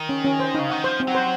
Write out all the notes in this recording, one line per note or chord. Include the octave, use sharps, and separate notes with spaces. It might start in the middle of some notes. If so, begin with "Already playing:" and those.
Already playing: D#3
C#4
C#4
C5
C#3 D#4
D#3 F#5
F3 C5
C4
F#3
C5